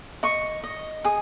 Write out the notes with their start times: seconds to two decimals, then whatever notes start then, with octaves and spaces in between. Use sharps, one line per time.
0.23 D#5 C#6
0.63 D#5
1.04 G#4 D#6